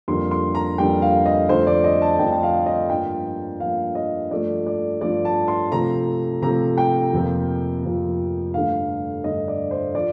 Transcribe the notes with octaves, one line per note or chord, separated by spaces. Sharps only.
F2 D3 G3 A#3 C6
C6
A#5
F2 D3 G3 A#3 G5
F5
D#5
F2 D3 A3 C5
D5
D#5
A5
F2 D3 A3 G5
G5
F5
D#5
G2 F3 A#3 G5
G2 F3 A#3 F5
D#5
G2 F3 A3 D5
D5
G2 F3 A3 D5
A5
C6
C3 F3 A3 A#5
C3 F3 A3 A#5
G5
F2 C3 F3 A#3
F2 C3 F3 A#3
G2 D3 A3 F5
G2 D3 A3 D#5
D5
C5
F3 D5